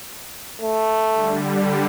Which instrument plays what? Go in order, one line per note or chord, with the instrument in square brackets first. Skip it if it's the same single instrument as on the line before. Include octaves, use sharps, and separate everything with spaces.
[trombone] A3
[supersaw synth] D3 G3